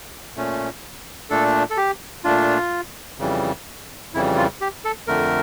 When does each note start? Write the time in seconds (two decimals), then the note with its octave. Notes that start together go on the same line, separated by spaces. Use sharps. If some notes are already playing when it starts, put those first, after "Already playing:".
0.36 A#2 A3 C#4
1.30 A#2 A3 D4 A4
1.70 A4
1.77 G4
2.24 A#2 A3 D4 F4
3.19 F2 C#3 E3 G3
4.14 F2 C#3 E3 G3 E4
4.37 F4
4.61 G4
4.85 A4
5.07 F2 D3 A3 A#4